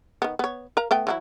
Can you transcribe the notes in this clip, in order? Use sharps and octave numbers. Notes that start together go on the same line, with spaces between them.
D#3 B3
B3 C#5
A#4 F5 A#5
A3 B3 G5
E3 F#3 E4